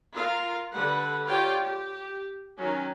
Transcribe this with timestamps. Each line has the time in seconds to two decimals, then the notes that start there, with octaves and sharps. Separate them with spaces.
0.14 F4 A#4 F5
0.72 D3 G3 B4 F#5
1.28 F4 G4 C#5 D5 G5
1.63 G4
2.59 D#3 F#3 C#4